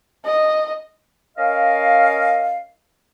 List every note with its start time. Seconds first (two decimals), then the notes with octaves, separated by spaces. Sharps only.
0.25 D#5
1.37 C#4 A#4 D#5 F5